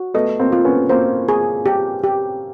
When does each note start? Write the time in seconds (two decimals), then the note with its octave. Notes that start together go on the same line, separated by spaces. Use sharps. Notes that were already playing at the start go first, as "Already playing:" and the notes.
Already playing: F#4
0.14 A3 B3 D#5
0.40 A#3 C4
0.52 F4
0.65 B3 C#4
0.89 A#3 C4 C5
1.29 G#4
1.66 G4
2.04 G4